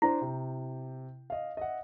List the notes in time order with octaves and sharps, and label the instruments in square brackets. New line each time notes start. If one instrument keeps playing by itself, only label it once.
[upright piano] D4 C5 [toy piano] E4
[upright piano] C3
D#5 F5
D#5 E5 F#5